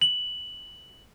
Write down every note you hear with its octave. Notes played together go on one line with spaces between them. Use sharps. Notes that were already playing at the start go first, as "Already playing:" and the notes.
F#7